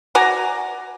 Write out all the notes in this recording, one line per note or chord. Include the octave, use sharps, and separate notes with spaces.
F#4 D5 G#5 A#5